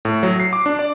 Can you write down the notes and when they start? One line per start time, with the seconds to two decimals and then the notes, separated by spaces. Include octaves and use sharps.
0.05 A2
0.23 F#3
0.40 C7
0.53 D6
0.66 D4
0.79 D5